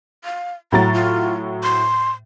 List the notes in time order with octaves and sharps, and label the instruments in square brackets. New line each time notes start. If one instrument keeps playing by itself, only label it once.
[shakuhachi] F5
[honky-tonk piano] A2 F#3 A6 [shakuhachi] A#5
[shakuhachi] F4
C6